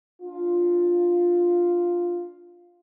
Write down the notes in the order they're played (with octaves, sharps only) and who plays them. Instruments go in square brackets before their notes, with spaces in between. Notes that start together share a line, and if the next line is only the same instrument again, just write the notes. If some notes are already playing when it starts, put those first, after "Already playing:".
[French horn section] D4 F4